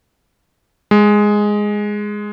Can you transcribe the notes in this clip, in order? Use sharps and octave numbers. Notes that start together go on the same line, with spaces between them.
G#3